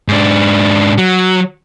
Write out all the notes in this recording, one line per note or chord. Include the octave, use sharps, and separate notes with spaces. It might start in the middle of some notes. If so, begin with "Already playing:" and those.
G#2 D4
F#3